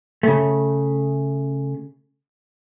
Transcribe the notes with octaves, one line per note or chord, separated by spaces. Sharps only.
C#3 A3